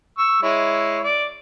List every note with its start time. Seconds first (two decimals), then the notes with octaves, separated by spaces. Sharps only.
0.18 C#6 E6
0.42 G#3 E4 C#5
1.04 D5